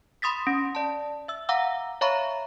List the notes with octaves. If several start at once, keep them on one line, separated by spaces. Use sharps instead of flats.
B5 C6 D#6 A6 B6
C#4
D5 A5
E5 E6
F5 F#5 A#5 D6 E6
C#5 E5 F5 A#5 B5 C#6